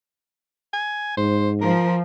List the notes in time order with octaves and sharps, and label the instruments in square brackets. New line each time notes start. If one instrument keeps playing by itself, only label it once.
[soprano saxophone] G#5
[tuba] G#2 [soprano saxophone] C5
[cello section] F3 [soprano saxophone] A#4